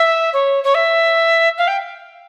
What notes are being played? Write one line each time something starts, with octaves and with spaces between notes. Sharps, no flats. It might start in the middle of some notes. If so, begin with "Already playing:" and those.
Already playing: E5
C#5
C#5
E5
F5
G5